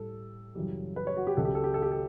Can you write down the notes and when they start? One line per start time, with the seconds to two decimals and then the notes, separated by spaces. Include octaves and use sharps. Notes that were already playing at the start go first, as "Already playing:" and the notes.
Already playing: A2 G3 A4
0.55 F#2 C#3 E3 G3
0.96 B4
1.07 C#5
1.17 F#4
1.27 G4
1.37 C#2 C#3 F#3 A4
1.45 G4
1.55 A4
1.64 G4
1.74 A4
1.82 G4
1.91 A4